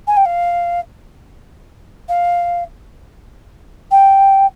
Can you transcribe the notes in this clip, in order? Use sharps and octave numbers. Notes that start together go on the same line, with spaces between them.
G#5
G5
F5
F5
G5